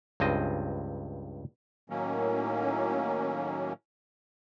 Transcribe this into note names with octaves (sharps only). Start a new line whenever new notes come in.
C#2 G2 C4 D#5
A2 D#3 F#3 A#3 C#4